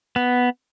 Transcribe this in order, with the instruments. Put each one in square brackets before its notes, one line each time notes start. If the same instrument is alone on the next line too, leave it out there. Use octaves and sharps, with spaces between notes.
[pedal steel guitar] B3